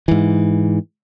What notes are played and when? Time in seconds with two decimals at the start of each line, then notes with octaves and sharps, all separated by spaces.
0.08 G#2 E3